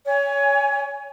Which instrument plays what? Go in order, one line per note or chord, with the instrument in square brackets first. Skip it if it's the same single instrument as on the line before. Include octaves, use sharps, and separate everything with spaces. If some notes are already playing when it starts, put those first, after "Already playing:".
[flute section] C#5 G#5